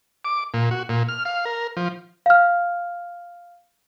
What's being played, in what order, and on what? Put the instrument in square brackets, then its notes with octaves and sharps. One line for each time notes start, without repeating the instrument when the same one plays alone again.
[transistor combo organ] D6
A#2
F#4
A#2
F6
F5
A#4
F3
[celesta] F5 F6